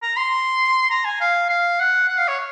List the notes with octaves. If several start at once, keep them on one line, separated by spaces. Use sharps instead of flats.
A#5
C6
A#5
G#5
F5
F5
F#5
F#5
F5
C#5